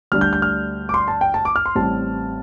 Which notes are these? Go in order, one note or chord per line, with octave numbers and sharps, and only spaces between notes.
D2 D3 G3 D4 F6
G6
G6
F6
D6
C6
A5
G5
A5
D6
F6
C6
A1 A2 G3 C4 A5